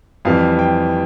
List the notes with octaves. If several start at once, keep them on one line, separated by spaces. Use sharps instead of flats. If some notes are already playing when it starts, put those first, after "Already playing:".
F2 E3 G3 F5
G5